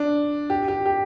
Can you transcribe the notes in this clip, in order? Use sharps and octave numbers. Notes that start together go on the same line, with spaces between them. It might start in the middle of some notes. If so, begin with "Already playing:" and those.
Already playing: D4
G4
G4
G4